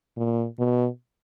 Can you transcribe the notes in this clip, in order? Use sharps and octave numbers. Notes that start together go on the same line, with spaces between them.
A#2
B2